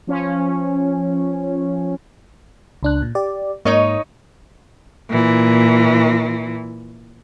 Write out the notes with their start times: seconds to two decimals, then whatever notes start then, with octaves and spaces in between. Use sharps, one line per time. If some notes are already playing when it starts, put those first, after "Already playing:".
0.07 F3 C#4
2.83 C#2 D4 F#6
3.02 A#2
3.15 G4 D5
3.65 G#2 A#3 D#4 C#5 D#5 C#6
5.09 A#2 E3